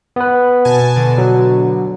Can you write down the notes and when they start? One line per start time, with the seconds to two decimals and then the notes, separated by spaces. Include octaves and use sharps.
0.16 B3 B4
0.65 B2 G#5 A5
0.96 B2 D3
1.18 F#3